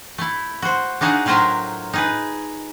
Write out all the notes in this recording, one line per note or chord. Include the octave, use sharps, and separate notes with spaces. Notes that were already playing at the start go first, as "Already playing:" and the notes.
A3 E4
F#4 C5
D4 D#4 F#4 G#4 F5
A2 F#3 F4 A#4 C5 E5
D#4 G#4 B4